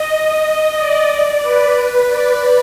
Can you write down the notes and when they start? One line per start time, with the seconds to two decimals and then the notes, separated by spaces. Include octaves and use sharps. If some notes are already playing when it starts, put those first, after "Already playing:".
Already playing: D#5
0.77 D5
1.42 B4
2.06 D5